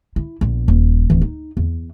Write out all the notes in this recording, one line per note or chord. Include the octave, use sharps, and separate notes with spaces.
E4
A#1 B3
D#1
D1 E3
D#4
E2